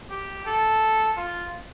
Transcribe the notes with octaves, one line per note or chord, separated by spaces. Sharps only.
G4
A4
F4